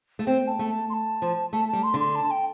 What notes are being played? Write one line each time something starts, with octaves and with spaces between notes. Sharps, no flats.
A3
C4 G5
A5
A3
A5
C6
A5
F3
A3 A5
G3 A5
C6
D3
C6
A5
G5